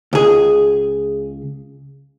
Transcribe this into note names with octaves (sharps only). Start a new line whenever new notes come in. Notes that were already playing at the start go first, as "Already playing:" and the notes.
C#2 G#4